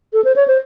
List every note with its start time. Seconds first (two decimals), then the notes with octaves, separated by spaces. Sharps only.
0.13 A4
0.24 C5
0.36 C#5
0.48 C5